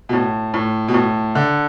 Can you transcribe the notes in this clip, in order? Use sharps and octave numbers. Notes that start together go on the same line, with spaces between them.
B2
A2
A2
B2
A2
D3